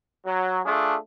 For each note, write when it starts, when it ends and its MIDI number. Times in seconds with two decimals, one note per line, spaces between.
0.25 0.60 54
0.65 0.95 57
0.65 0.95 62
0.65 0.95 65
0.65 0.95 68